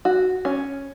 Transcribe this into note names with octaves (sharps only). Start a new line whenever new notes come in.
F#4
C#4